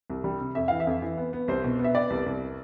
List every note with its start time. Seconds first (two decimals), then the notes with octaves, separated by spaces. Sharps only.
0.10 C2
0.24 G3
0.40 C3
0.55 F2 E5
0.68 E3 F5
0.80 E5
0.87 F2
1.02 E3
1.18 B3
1.33 B3
1.48 C2 C5
1.64 B2
1.79 B3
1.84 E5
1.95 B3 D5
2.10 C2
2.26 C2